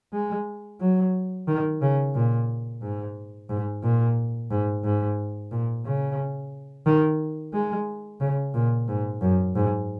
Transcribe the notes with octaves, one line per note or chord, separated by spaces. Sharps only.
G#3
F#3
D#3
C#3
A#2
G#2
G#2
A#2
G#2
G#2
A#2
C#3
D#3
G#3
C#3
A#2
G#2
F#2
G#2